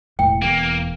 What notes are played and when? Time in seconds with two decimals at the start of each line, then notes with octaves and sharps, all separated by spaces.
0.19 E1 A2 G5
0.42 E2 A#3